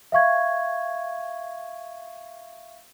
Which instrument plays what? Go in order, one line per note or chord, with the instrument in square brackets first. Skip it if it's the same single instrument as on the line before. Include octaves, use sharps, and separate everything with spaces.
[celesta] E5 F5 C#6 G#6